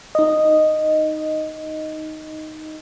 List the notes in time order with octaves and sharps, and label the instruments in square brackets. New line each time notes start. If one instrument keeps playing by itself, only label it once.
[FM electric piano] D#4 D#5